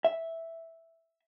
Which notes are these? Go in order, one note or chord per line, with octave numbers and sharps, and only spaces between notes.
E5